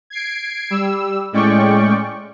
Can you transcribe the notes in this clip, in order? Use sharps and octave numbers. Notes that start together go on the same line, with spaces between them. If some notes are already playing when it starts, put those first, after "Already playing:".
G#6 C7 D7
G3 E6
A2 G#3 C#4 D5 G5 C#6